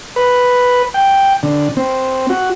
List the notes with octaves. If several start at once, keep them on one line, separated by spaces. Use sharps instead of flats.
B4
G5
D3
C4
F#4